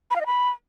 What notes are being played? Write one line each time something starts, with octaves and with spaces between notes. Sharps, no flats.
B5
F5
D#5
B5